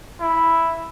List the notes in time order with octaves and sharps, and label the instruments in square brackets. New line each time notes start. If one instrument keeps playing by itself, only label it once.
[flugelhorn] E4